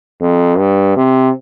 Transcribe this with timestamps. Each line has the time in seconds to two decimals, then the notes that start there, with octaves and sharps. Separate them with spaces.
0.21 F2
0.59 G2
0.97 C3